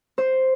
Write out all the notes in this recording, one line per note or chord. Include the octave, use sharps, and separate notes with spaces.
C5